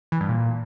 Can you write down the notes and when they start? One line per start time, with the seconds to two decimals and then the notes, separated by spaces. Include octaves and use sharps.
0.12 E3
0.20 G2
0.28 A#2